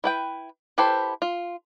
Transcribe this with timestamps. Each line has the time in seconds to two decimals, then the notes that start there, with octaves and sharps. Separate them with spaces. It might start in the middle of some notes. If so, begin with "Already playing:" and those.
0.04 E4 B4 G5
0.78 E4 G4 A4 B4 C5
1.22 F4